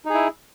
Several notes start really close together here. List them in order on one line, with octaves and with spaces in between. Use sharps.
D#4 G#4 E4